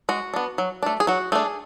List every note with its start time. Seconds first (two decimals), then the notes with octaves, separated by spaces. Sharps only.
0.09 G#3 F#4
0.34 B3 D4
0.58 F#3
0.83 A3 D4
1.00 G#4
1.07 F#3 F#4
1.32 A3 D4 G#4